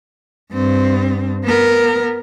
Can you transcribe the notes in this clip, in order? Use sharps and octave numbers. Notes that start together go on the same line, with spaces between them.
G2 C4
B3 A#4